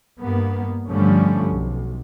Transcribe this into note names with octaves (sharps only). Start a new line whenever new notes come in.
G2 A#3 B3
G2 D3 F3 G3 A3 C#4
B1